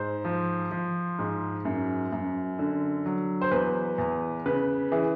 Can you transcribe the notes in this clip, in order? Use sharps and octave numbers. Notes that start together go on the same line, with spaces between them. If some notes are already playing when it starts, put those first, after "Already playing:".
Already playing: G#2 C5
F3
F3
G#2
F#2
F#2
D3
F#3
C5
E2 B4
E2
C#3 B4
E3 G#4